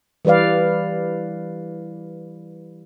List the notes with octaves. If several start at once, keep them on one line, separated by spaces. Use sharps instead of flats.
E3 G3 B4 D5 F5